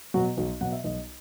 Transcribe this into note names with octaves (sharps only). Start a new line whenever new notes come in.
B2 F#3 F#4
B1 F#4
B2 F#3 F#5
E5
B1 D#5